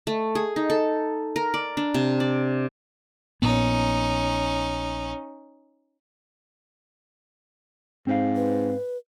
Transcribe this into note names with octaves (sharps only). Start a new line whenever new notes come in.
A3
G#4
D#4
A4
A#4
D5
D4
C3
D5
A#1 A#2 B3 C#4 D#4
G#2 C4 C5 F5
B4